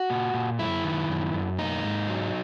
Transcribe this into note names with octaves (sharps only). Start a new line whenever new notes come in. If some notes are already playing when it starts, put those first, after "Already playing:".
Already playing: F#4
A#2
A#2
F#2 E4
D#3
F#2
F#2
A#3 D#4
G#2
F#3